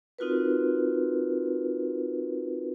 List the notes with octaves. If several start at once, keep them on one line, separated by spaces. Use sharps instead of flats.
C4 D#4 F4 F#4 A#4 B4